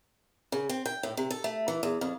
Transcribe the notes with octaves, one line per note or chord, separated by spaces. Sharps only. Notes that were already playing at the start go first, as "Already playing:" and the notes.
C#3
C4
G5
A2
C3
A4
A3
E3
E2
F2